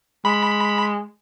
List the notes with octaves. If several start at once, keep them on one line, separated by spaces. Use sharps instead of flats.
G#3 B5